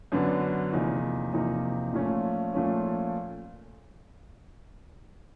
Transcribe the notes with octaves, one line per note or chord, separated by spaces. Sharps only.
F#2 D3 F#3 B3 D4
E2 C3 F3 A#3 D#4
E2 C3 F3 A#3 D#4
A#2 F3 A3 C#4
A#2 F3 A3 C#4